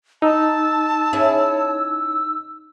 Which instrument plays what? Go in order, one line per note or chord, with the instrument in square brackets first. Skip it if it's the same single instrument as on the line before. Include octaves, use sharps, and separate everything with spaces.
[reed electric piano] D#4 [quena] A5 [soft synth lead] E6
[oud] C#4 E4 G#4